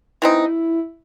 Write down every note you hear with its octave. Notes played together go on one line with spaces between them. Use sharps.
E3 C4 D#4 E4